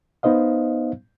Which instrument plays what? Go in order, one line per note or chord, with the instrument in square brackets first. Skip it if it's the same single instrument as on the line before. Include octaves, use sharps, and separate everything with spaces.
[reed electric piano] B3 D#4 C5 D#5 F5